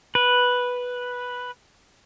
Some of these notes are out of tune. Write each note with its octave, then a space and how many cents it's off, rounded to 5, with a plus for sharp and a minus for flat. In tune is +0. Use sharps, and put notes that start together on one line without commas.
B4 -5